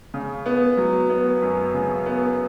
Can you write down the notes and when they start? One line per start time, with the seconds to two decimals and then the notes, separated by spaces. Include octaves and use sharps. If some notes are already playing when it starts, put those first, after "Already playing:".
0.14 C#3
0.46 B3
0.77 F#3
1.10 B3
1.42 F#2
1.74 C#3
2.06 B3